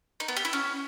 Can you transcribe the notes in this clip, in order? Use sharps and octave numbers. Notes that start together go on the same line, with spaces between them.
D#4
B3
G4
E4
C#4